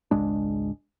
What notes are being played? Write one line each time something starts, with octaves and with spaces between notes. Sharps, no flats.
G#1 C#2 G#3 D4